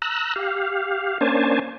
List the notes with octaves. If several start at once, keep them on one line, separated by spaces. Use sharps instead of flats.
A#5 E6 F#6
G4 F5
A#3 C#4 D4 C5 G#5 A5